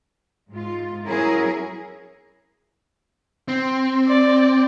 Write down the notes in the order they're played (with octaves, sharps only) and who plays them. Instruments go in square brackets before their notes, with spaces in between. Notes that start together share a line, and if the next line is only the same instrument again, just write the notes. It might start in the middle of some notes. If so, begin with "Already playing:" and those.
[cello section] G#2 F4
F#3 C#4 E4 G#4 A#4
[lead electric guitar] C4
[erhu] D5